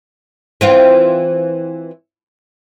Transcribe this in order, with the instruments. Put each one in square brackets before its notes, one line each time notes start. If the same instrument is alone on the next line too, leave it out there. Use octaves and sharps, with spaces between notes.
[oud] E3 C4 F4